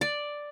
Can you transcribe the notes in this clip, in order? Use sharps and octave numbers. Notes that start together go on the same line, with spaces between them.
D5